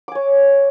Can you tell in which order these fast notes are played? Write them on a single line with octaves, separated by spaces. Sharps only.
D6 G#5 C#5